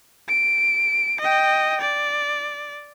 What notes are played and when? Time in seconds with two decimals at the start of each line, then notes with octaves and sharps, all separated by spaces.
0.29 D7
1.21 D#5 G5
1.81 D5